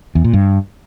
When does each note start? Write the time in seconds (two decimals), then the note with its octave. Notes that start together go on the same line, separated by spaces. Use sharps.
0.15 E2
0.24 A#2
0.33 G2